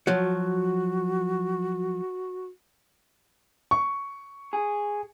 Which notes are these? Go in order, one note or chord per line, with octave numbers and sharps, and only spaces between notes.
F3 F#3 F#4
C#6
G#4